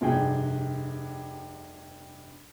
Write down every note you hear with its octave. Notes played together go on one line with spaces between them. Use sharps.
F1 G2 C3 F#4 G#4 G5